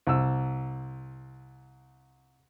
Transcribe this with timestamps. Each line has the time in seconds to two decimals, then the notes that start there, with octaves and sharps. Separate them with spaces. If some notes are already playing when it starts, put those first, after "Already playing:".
0.07 C2 E6